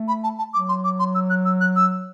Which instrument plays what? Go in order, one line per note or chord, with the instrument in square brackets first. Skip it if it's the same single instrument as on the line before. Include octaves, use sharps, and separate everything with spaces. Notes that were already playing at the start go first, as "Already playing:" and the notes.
Already playing: [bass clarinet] A3
[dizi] B5
A5
A5
[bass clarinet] F#3 [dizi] D6
[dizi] C6
D6
C6
E6
F#6
E6
F#6
E6